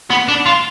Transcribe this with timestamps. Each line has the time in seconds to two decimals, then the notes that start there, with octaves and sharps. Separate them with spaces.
0.10 B3
0.28 D4
0.46 F4